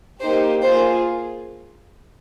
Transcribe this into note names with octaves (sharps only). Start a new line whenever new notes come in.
A#3 D#4 G4 C5
A#3 F4 G#4 C5